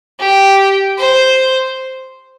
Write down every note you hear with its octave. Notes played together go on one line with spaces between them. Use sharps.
G4
C5